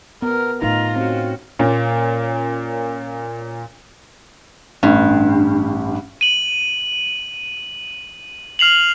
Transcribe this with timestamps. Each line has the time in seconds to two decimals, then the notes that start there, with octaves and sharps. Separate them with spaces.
0.22 B3 A#4
0.62 A2 D3 D#4 F4 A#5
0.96 C4 C#4 F#4
1.59 A#2 A#3 C#4
4.83 A1 G2
6.21 D#7 F#7
8.59 F6 C7 F7 F#7